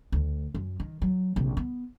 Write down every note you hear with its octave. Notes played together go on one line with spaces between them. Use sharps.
D2
F#2
D#3
F#3
A#1 C3
B3